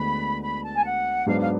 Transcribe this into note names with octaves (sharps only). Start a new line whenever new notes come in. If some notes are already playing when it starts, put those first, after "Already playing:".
Already playing: D2 D3 G#3 B3 B5
B5
A5
G#5
F#5
G#2 F#3 B3 D4 F5
F5